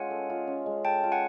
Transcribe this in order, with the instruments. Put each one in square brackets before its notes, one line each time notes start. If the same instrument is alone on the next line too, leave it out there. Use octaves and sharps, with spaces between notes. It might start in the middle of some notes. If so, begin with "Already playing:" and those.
Already playing: [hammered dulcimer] G#3 C#4 F4 [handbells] F#5 G#5
[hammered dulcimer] A4
F4
C#4
G#3
[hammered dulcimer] A4 [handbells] G5 A5
[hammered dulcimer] F4
[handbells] F#5 G#5